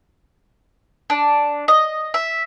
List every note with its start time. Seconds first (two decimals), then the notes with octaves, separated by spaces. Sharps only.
1.10 D4
1.68 D#5
2.14 E5